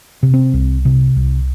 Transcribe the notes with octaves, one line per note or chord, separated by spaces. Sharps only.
C3
C4
C2
C3
C2